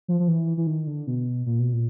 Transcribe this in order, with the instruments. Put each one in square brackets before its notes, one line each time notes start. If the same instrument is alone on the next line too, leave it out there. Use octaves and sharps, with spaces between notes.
[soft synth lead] F3
F3
E3
E3
D#3
D3
B2
A#2
B2
A#2